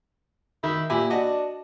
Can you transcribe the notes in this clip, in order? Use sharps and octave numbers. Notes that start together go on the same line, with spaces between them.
D#3 E4
A#2 E4 G4 G#5
D4 F#4 D#5